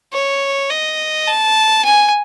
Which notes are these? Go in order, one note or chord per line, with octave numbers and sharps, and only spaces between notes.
C#5
D#5
A5
G#5